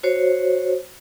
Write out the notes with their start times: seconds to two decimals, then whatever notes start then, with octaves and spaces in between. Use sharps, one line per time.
0.03 F#4 C5 C#5